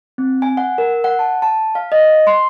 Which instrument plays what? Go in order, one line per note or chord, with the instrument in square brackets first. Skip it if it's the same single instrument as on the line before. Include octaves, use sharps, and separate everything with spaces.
[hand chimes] C4
G#5
F#5
A#4
F#5
A5
A5
F5
D#5
C6